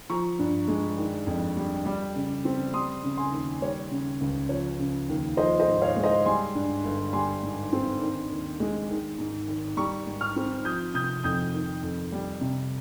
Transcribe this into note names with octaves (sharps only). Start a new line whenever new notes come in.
F3 A#5 C#6
G2
G#3
D#3
F2
G3
G3
C#3
C4
G3 C6 D#6
C#3
G#5 C6
D#2
G3 C#5
C#3
C#2
F3 C#5
C#3
D#2
F3 C5 D#5
C5 D#5
G#2
C#5 F5
G#3
C5 D#5
G3 G#5 C6
G2
G1
G3 G#5 C6
G#2
C4
D#3
D#2
G#3
D#3
G#2
G#1
G3 A#5 C#6
G#2
C#6 F6
C4
F3 D#6 G6
C3 D#6 G6
F2 D#6 G6
D#3
F2
G3
C3